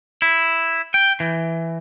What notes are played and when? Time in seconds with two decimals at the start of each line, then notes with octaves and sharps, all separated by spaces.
0.22 E4
0.94 G5
1.20 E3